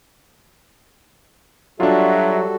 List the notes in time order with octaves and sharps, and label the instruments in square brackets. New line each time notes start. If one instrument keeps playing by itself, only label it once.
[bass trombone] F#3 [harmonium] G3 F#4 A4 [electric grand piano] D4 F4 [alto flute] E5